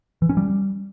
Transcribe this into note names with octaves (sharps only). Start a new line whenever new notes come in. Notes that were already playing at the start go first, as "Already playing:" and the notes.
E3
C#4
G3